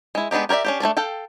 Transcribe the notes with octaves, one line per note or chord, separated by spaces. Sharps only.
G#3 E4
G#3 B3 D4 D#4 G4
G4 A#4 C#5 D5 E5
C#4 D4 G4
A3 C#4 D4 D5
A4 F5 G5